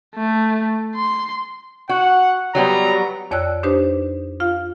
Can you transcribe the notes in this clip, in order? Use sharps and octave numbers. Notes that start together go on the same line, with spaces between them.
A3
C6
F#4 F#5
F#3 G3 B3 A#5
F2 C#5 D5 G5 E6 F#6
D4 D#4 G4 B4 C5
F4 F5